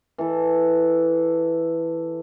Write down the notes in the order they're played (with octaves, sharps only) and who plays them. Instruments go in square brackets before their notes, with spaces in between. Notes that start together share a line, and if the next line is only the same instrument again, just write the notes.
[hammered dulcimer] E3 A4